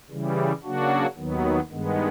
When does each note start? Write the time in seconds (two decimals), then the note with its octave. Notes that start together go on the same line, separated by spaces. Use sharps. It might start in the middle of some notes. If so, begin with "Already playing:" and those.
0.10 C#3 E3 G3
0.64 C#3 F#3 A#3 D4 F#4
1.17 D#2 D#3 F#3 B3
1.70 G2 D#3 G#3 B3